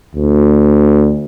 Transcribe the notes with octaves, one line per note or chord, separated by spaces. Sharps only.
D2